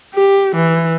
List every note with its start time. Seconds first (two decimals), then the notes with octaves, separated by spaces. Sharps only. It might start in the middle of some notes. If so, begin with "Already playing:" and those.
0.14 G4
0.56 E3